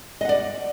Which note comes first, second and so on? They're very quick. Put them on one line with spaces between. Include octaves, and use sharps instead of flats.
D#5 F#5 D5